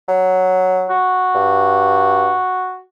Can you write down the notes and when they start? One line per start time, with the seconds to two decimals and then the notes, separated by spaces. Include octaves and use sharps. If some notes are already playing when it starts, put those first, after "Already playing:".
0.08 F#3
0.89 F#4
1.35 G2